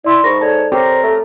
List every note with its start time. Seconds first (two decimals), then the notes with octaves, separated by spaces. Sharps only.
0.05 E4 D5 C6
0.24 G#2 A#4 B5 C#6 A#6
0.41 A4 C#5 D5 A5
0.72 C4 G4 A#4 C5 C#5
1.03 A3 A4